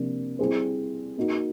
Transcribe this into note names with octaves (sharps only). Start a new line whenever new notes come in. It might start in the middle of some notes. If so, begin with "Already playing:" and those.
Already playing: C3 F3 A#3 D4
G3 C4 E4 G#4 C5
A#3 D#4 F#4